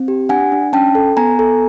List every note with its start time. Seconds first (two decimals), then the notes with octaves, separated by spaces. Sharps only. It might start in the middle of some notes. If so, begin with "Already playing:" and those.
Already playing: C4
0.08 G4
0.29 D4 F#5 G#5
0.52 D4
0.73 C#4 G5 A5
0.95 A4
1.17 B3 G#5 A#5
1.39 A4